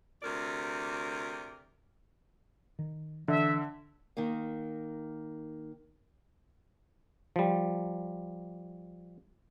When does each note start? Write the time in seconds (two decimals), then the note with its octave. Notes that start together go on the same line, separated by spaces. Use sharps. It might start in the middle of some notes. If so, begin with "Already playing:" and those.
0.23 D2 C3 A#4 D5
2.79 D#3
3.28 D3 E3 E5
4.17 D#3 A#3
7.36 F3 G3